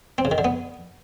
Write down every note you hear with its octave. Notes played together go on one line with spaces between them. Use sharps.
C4
C#3
D#3
D3
B3